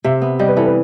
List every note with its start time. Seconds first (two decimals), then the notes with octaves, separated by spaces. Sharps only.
0.04 C3 E5
0.22 B3
0.39 G3 D#5
0.48 B4
0.57 E3 A4
0.65 B4